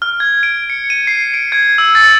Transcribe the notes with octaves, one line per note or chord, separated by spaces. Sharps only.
F6
G#6
D7
C#7
D#7
C7
D7
G#6
E6
A6